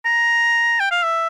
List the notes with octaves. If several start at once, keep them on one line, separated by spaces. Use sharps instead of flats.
A#5
G5
F5
E5